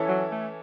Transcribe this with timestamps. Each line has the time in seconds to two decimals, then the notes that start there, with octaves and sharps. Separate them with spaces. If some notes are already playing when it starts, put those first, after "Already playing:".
Already playing: E3 C#4 E4 A4
0.08 F#3
0.31 A3